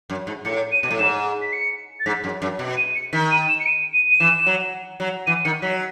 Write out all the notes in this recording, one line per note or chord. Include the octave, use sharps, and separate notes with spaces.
F#2
G#2
A2 C#7
D#7
B2
A2
G#2 E7
B6
C#7
A6
G#2 B6
F#2
F#2
B2
D#7
C#7
D#3 B6
D#7
E7
C#7
D#7
D#7
D#7
E3 E7
F#3
F#3
E3 D#7
D#3 C#7
F#3 B6